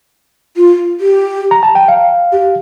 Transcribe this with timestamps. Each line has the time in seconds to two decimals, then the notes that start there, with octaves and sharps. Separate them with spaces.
0.57 F4
1.00 G4
1.51 A#5
1.63 A5
1.75 G5
1.88 F5
2.32 G4